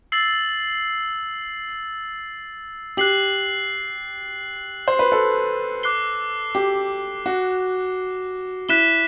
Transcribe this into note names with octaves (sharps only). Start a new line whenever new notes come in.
E6 A6 C7 F#7
G4 F#6 C7 F#7
C5
B4
A4
D6 F#6 C7 G7
G4
F#4
E4 F#6 B6 E7 G7